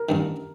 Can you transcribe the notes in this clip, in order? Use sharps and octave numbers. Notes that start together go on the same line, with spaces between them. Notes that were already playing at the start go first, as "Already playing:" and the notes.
Already playing: A#4
A1 G2 D#3